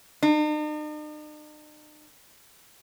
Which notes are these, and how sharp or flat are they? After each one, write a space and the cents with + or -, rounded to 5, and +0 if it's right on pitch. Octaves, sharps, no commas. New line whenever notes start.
D#4 -45